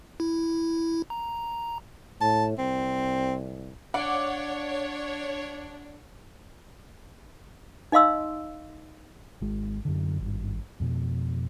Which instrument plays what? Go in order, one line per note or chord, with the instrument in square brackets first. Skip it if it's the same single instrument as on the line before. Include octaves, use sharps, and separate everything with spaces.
[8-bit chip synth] E4
A#5
[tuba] A2 [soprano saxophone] A5
[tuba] C2 [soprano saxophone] C4
[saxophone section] D4 [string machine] C#5 [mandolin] D5 [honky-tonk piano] F5 F#5
[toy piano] D#4 D#5 F5 C6 E6
[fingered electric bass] G#1 G#3
F#2 D3
G#1 G2
F2 B2